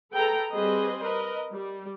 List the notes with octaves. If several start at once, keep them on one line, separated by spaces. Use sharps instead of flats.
G#4 A4 B4 G5 A#5
G3 C4 G#4 B4 C5 D#5
A#4 B4 D#5
G3